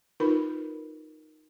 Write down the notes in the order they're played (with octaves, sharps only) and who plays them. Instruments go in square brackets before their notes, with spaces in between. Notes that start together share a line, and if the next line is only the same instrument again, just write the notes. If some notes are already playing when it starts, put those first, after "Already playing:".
[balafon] D#4 F4 A#4 B4 B5